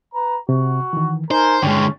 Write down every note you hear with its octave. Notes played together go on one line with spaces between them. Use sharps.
B4 A#5
C3 F#4
D#3 E3
D#4 A#4 C5 G#5
G2 D3 G#3 C#4 G5 C#6